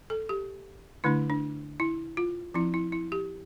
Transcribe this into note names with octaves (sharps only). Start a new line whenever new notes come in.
A4
G4
D3 A3 D4 E4
D4
E4
F4
F3 C4 E4
E4
E4
G4